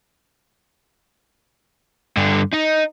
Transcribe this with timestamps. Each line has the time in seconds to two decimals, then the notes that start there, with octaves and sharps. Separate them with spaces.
2.17 G2 D3
2.53 D#4